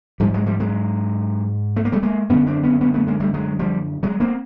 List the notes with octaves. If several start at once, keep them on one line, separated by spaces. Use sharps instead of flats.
G#2 F3 G3
F#3 G#3
F3 G3
F#3 G#3
A3
A#3
G3 A3
G#3 A#3
F#2 D3 B3 C#4
C4 D4
B3 C#4
B3 C#4
A3 B3
G#3 A#3
G3 A3
F#3 G#3
F3 G3
F#3 G#3
A#3 C4